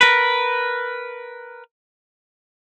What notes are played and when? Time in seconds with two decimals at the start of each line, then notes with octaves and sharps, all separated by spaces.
0.01 A#4 B4